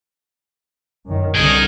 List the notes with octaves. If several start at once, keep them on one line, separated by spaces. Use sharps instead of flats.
F#2 D#3
C2 D3 D#3 D#4 G#4